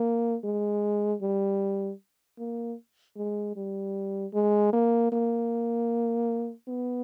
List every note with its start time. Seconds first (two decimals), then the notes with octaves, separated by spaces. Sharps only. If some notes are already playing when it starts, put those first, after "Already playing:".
Already playing: A#3
0.44 G#3
1.22 G3
2.39 A#3
3.17 G#3
3.56 G3
4.34 G#3
4.73 A#3
5.12 A#3
6.68 B3